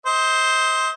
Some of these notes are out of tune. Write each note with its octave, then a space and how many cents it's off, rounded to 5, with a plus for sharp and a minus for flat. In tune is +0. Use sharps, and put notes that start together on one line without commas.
C5 +0 D#5 +35